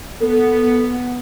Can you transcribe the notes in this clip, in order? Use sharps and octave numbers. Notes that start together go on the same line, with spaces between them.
B3 A4